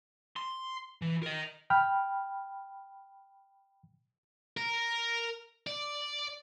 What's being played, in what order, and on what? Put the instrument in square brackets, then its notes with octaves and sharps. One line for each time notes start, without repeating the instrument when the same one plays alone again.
[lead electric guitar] C6
E3
A#4 D#5
[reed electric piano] G5 B5 F6
[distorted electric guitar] A#4
D5